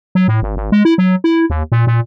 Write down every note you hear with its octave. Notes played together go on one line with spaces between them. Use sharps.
F#3
A2
G#1
G#1
G#3
E4
F#3
E4
D#2
A#2
A#2